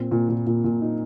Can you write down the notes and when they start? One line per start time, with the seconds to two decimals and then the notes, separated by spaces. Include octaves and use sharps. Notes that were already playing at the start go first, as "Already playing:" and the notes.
Already playing: A#2 C4
0.11 A#2
0.29 A#2
0.47 A#2
0.64 A#2
0.81 D#4